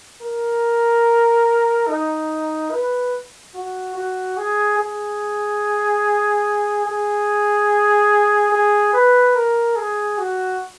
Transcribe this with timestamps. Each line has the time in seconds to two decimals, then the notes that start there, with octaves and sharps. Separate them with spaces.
0.21 A#4
1.88 D#4
2.71 B4
3.54 F#4
3.95 F#4
4.37 G#4
4.78 G#4
6.86 G#4
8.52 G#4
8.93 B4
9.35 A#4
9.76 G#4
10.18 F#4